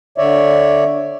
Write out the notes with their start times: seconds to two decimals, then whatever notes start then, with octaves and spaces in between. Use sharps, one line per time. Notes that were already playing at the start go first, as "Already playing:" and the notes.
0.18 D3 C#5 D5 E5